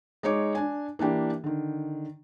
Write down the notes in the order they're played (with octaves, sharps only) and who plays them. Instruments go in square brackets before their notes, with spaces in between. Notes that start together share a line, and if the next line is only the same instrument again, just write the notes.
[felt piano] G#3 D#4 C#5 D6
D4 G#5
E3 A#3 D4 G4
D3 D#3